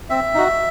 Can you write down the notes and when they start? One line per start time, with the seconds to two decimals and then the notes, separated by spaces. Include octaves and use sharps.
0.10 C4 E5
0.34 D#4 F#4